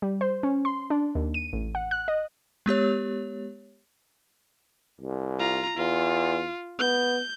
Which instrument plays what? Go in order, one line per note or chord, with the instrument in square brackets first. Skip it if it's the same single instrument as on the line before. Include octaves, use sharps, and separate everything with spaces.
[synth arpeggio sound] G3
C5
C#4
C6
D4
D#2
D#7
A1
F#5
F#6
D#5
[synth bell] G#3 B3 G4 C#5
[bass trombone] C2
[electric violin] F4 A#5
[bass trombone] E2 [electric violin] F4
[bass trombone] B3 [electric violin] G6